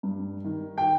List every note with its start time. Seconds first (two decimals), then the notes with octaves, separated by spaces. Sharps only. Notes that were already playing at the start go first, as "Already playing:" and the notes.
0.03 G2
0.44 D#3
0.78 G5